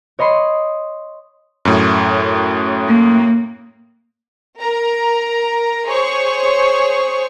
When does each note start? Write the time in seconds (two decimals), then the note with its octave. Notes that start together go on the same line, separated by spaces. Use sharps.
0.19 C#5 D#5 B5 C6
1.65 F#2 A2
2.87 A#3
4.59 A#4 A#5
5.87 G#4 C5 C#5 C#6